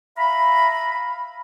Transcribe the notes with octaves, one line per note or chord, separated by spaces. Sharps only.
E5 F5 A#5 B5